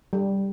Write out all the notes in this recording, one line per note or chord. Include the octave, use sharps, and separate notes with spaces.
G3